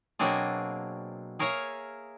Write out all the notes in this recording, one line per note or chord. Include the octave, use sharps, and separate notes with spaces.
B2 F#3 A#3 C4 D4 G#4
G#4 A#4 C#5 E5 F5 A#5